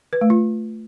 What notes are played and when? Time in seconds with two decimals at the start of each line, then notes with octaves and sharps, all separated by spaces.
0.13 B4
0.21 A3
0.30 F4